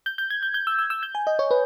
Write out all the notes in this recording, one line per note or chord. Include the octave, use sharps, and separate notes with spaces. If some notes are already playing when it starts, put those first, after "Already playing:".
G6
G6
G#6
G6
G6
E6
E6
E6
G6
G#5
D#5
C#5
B4